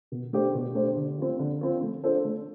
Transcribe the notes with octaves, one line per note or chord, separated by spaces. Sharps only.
B2
A3 D4 G4 C5
B2
A3 D4 G4 C5
D3
F3 C4
D3
F3 C4
A3
D4 F4 A4 C5
A3